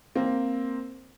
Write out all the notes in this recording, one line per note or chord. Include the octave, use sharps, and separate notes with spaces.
A#3 C4